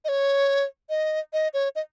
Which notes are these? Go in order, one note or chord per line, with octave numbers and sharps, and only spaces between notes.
D#5
C#5
D#5
D#5
C#5
D#5